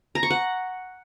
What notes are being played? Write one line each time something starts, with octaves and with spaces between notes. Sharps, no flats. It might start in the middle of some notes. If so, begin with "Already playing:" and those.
A#5
C#6
F#5